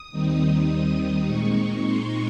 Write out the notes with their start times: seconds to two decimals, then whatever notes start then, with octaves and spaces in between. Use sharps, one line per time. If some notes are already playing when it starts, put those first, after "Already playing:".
Already playing: D#6
0.11 D#2 D#3 G3 C4 D#4
0.68 D#6
0.97 D#6
1.25 A#2 G#3 C4 D#4 C#6
1.82 C6